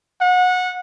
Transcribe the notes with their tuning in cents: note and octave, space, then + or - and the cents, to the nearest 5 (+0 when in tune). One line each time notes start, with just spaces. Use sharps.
F#5 -25